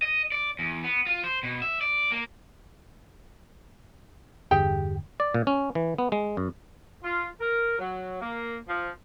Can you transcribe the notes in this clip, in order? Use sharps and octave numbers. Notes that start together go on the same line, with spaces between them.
D#5
D5
E2
B3
F4
C5
B2
E5
D5
A#3
E2 G2 D3 G4 G#4 G5
D5
A#2
C#4
E3
B3
G#3
F#2
F4
A#4
F#3
A#3
F3